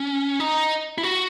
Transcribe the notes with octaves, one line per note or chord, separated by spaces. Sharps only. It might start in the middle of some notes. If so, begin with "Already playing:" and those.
Already playing: C#4
D#4
E4
F#4